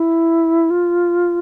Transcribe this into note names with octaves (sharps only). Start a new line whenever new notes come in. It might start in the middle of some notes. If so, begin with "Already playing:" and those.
Already playing: E4
F4